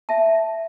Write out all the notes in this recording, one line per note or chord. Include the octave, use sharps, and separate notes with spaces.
E5 A5